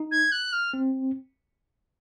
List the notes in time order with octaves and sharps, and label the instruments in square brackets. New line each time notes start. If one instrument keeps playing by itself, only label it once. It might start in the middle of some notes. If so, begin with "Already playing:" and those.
Already playing: [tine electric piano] D#4
[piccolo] G#6
F#6
F6
[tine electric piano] C4